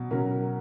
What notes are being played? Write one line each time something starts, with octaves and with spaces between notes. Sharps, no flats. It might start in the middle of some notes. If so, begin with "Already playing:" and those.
Already playing: B2 F#3
B2 F#3 C#4 A#4